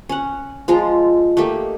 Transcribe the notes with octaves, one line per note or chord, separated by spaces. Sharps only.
C#4 F#5
F3 G#3 F4 A#5
A3 A#3 D#4 G4